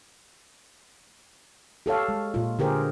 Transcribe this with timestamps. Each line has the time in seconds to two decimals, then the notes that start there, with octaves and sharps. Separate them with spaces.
1.86 G4 A4 C#5 F5
2.09 G#3
2.34 A#2 F4
2.59 D3 G4 G#4 A#4 C5